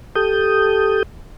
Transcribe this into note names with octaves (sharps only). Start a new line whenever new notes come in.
G4 A4 D#6 G6